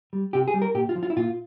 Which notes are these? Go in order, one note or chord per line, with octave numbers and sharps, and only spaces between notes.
G3
C3 G4
G#4
G3
A#4
A#2 G4
F4
F3
F4
E4
A#2 F4